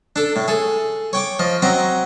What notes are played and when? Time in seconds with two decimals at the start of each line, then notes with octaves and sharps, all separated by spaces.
0.16 D4 A4
0.36 A2
0.48 G#4 A4
1.13 C#5 G5 D6
1.39 F3 D#5
1.62 F#3 C4 D#5 A#5